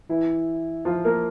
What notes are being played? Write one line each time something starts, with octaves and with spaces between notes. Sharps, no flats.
E3 E4
F3 F4
A#3 A#4